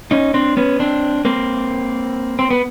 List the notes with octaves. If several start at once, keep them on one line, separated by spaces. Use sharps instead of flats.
C#4 D#4
C4 D4
B3 C#4
C4 D4
A#3 C4
C4
B3